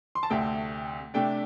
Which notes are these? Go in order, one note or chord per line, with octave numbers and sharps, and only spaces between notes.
C6
A5
D2 C3 A3 C4 G5
C3 A3 D4 G5